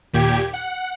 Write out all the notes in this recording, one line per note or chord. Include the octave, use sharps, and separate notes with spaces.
D#2 A#2 G4 G#6
F#5